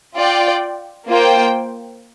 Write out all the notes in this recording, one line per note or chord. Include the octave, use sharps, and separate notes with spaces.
F4 D5 G5
A#3 F4 C5 G5